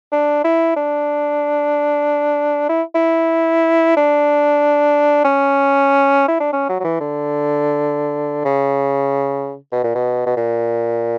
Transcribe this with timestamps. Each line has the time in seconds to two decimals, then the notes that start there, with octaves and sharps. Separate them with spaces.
0.12 D4
0.44 E4
0.76 D4
2.69 E4
2.95 E4
3.97 D4
5.24 C#4
6.28 E4
6.40 D4
6.53 C#4
6.69 F#3
6.80 F#3
6.84 E3
7.00 D3
8.45 C#3
9.72 B2
9.84 A#2
9.95 B2
10.26 B2
10.36 A#2